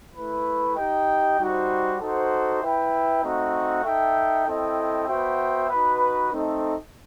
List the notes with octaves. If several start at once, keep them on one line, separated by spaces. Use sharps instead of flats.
A3 E4 B4
D#4 G4 D#5 G5
G3 D#4 F#4 C5
D#4 F#4 A4 C5 F#5
E4 B4 E5 G5
A3 C4 D#4 F#4
D#4 A4 E5 G5
C4 E4 A4 D#5 G5
B3 F#4 C5 E5 G5
D#4 F#4 B4
A3 C4 D#4 A4 D#5